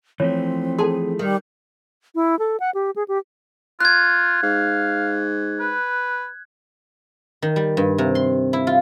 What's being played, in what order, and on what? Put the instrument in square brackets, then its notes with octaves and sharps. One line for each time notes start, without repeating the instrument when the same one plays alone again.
[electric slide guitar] E3 F3 A3 [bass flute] C4 [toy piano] C#5
[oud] G#4 [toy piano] A4 A5 C6
[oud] D#3 [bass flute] G3
[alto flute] E4
A4
F#5
G4
G#4
G4
[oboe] F4 [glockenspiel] F#6 G#6
[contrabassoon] G#2 [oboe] F5
[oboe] B4
[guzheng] D#3
G3
G2
C3
C6
E4
F4